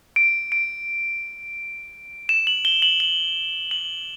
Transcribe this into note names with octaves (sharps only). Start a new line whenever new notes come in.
D7
D7
E7
F#7
G7
F#7
F#7
F#7